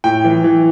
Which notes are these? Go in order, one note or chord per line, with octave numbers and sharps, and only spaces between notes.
A2 G5
E3
E3